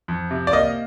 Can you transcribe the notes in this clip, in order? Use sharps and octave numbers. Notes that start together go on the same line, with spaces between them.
F2
C3
D5
A#3 D#5